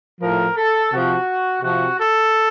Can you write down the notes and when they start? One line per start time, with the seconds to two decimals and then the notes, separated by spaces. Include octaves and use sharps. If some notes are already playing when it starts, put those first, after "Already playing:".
0.21 A2 F3 A#4
0.57 A4
0.91 C3 F3 F#4
1.62 C3 F3 F#4
1.98 A4